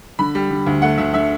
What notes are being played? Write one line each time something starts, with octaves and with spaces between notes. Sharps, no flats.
D3 B5
G3
D3
D2
A3 F#5
D2 E5
D3 E5